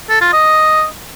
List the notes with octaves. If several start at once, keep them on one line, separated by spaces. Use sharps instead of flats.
A4
F4
D#5